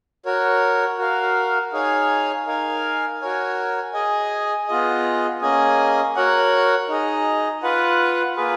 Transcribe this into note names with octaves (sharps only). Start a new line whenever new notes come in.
F#4 A#4 C#5
F#4 A#4 F5
D#4 G#4 C#5 F5 G#5
D#4 A#4 F5 G#5
F#4 A#4 C#5 G#5
G#4 D#5 G#5
B3 F4 G#4 D#5
A#3 C#4 G#4 D#5 G#5
F#4 A#4 C#5 F#5
D#4 G#4 D#5
F4 B4 F#5
A#3 F4 G#4 B4